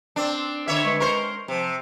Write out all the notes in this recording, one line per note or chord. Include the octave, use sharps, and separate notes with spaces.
C4 D4
D3 C#5 E5
G#3 B4 C#6
A#4 C5
C3 F3